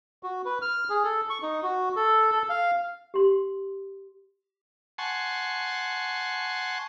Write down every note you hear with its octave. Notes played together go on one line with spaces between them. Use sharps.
F#4
B4
F6
G#4
A4
C#6
D#4
F#4
A4
A4
F5
G4 C6
F#5 G#5 A5 C6 C#6